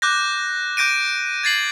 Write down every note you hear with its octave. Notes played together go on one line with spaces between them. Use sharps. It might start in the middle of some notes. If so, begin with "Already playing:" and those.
D6 F#6 G6 A#6
D6 G6 A#6 D7 D#7
G#6 A6 C7 F#7